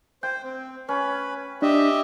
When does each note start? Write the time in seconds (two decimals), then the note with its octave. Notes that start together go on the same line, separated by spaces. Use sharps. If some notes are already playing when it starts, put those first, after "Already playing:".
0.23 C5 G5
0.44 C4
0.89 C#4 B4
1.62 D4 G4 D#5 E5